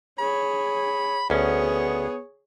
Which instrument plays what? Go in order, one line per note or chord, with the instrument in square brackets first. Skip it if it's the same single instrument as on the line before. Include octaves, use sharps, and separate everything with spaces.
[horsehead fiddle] G#4 C#5 [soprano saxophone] B5
[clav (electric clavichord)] D2 C#4 [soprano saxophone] B3 [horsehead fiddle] G#4 C#5